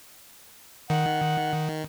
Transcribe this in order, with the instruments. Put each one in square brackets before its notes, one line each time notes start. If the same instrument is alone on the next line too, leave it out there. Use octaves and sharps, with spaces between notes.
[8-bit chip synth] D#3 [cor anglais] F#5